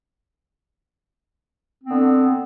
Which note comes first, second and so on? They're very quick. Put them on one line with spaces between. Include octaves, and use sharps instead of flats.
C4 B3 D3